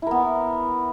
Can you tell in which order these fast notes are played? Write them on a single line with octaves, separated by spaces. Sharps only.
E4 A#4 B3